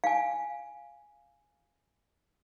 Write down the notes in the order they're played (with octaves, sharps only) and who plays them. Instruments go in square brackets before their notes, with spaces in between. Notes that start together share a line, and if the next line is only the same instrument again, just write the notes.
[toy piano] F5 G#5